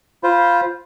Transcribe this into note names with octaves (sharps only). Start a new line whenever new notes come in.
F4 C5 B5